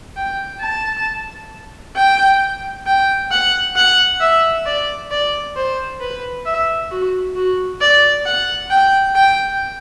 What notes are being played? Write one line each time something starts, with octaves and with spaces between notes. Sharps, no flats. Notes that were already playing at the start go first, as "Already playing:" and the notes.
G5
A5
G5
G5
F#5
F#5
E5
D5
D5
C5
B4
E5
F#4
F#4
D5
F#5
G5
G5